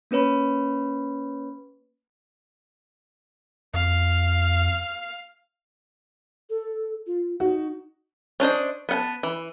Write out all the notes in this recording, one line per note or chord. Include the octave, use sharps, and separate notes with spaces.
A#3 C#4 B4 C#5 B5
F2 F5
A4
F4
D#4 F#4
C#4 D4 C5 D#5
B3 F#5 A5
E3